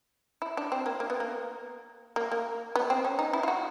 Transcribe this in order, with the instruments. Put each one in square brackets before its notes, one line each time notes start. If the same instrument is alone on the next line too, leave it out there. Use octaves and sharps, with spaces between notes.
[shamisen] E4
D4
C4
A#3
A#3
B3
A#3
A#3
A#3
B3
C4
C#4
D#4
E4
F4
F#4